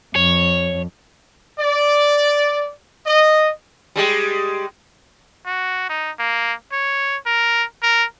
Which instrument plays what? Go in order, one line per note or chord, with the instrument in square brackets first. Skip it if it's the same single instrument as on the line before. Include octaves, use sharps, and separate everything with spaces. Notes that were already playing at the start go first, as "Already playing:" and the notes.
[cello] F2 [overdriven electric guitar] C#5
[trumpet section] D5
D#5
[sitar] G3 G#3 G4
[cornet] F#4
D#4
A#3
C#5
A#4
A#4